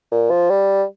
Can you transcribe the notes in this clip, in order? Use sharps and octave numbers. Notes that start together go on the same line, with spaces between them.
A#2
F3
G3